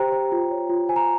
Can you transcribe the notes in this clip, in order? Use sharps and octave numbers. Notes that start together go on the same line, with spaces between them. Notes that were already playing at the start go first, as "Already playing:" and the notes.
Already playing: G4 C5 G5 A#5
C5
F4
C#5
F4
C5 G#5
A#5